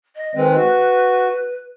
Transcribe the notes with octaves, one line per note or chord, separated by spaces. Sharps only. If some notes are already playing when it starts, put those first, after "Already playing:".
D#5
D#3 G#3 C4 B4
F#4